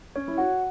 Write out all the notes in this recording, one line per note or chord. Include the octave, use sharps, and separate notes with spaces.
C#4 C#5
E4
F#4 F#5